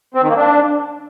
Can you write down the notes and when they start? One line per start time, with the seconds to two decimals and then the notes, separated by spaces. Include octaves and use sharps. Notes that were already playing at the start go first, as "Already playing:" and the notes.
0.14 C4
0.22 D#3
0.29 A#3
0.37 D4